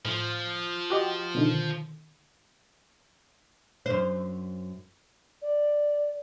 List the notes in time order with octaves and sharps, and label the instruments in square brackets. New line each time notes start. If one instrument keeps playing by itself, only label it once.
[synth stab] A2 [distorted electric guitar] F3
[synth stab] F#4 G4 D#5
B2 D3 D#3
[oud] F#2 C5
[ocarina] D5